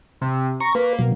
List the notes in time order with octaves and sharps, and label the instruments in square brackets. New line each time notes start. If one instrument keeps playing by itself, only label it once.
[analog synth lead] C3
[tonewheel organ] A#5 [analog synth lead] C#6
[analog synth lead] A#3 [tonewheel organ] B4
[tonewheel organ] B2 F#3